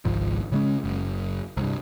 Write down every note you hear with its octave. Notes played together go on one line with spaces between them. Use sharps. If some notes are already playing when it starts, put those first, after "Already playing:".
G#1 C#2 G#2 F3
C#3 G#3 C#4
F#1
C2 G2